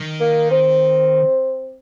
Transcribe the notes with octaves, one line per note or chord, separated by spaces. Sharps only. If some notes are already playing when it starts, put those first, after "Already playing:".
Already playing: D#3
A#3
C4